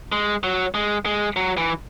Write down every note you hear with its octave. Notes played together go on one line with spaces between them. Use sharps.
G#3
F#3
G#3
G#3
F#3
E3